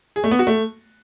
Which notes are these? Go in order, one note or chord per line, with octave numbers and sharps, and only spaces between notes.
G#4
A3
B3
F#4
A3